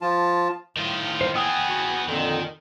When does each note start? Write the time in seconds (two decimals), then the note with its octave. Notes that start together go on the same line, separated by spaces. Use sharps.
0.02 F3 F4 A5
0.77 A2 D#3 F4
1.21 C5
1.35 B3 G#4 G5 D#6 E6
1.69 F#4
2.08 F2 A#2 D3 D#3